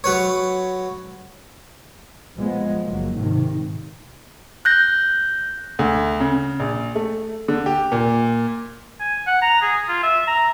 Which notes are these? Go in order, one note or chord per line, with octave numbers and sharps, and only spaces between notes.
F#3 B4 C#5
F3 G#3 B3
F#1 F#3 A#3
G#2 C3 D#3
F#6 G6 A#6
D2
C#3
A#1
A3
D3
G4
A#2
G#5
F#5
A#5
G#4
F4
E5
A#5